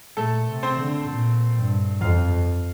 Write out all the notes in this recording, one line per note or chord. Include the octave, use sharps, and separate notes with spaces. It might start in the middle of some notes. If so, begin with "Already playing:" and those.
A#2 A3 A4
C3
C4 C5
D3
A#2
G2
F2 F4 F5